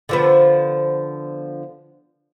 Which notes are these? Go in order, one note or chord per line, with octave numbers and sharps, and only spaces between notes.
D3 F3 B3